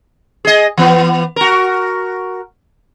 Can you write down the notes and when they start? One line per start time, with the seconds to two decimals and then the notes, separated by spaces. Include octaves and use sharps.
0.45 G#4 D#5
0.77 E3 B3
1.36 F#4 A#4